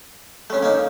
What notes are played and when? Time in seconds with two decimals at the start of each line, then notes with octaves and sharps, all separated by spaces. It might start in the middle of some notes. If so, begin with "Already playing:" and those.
0.50 A3 C#4 A4 C#5
0.63 A#3 C#4 D#4